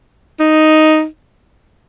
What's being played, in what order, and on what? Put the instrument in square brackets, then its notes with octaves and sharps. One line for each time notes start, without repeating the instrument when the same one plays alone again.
[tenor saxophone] D#4